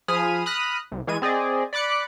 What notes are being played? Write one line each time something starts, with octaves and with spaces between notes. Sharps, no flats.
F3 G#4 B5 D#6 F6 D#7
B5 D#6 F6 F#6 A#6
C2
E3 G#3 G#6 D#7
C4 G#4 D5 D#5
D5 B5 D6 F#6 C#7